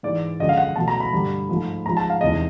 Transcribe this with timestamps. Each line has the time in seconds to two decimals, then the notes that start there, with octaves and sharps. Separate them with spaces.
0.03 G#2 E3 G#3 D5
0.39 F#2 D3 F3 G#3 D#5
0.49 F5
0.57 F#5
0.76 B2 F#3 A3 A5
0.88 A#5
1.00 B5
1.13 G2 D3 G3
1.49 G#2 F3 A3
1.86 G#2 F3 G#3 A#5
1.97 A5
2.10 F5
2.21 E2 C3 D#3 G#3 D#5